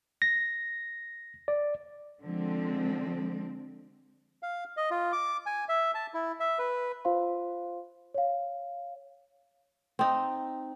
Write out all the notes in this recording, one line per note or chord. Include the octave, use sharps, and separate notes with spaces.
A#6
D5
D3 F3 G#3 C4
F5
D#5
F4
D6
G#5
E5
A5
E4
E5
B4
F4 C5 F5 C6
C#5 F5
C4 D#4